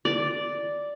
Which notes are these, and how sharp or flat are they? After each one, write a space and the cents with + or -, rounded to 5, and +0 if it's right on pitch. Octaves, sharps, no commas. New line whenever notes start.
D5 -5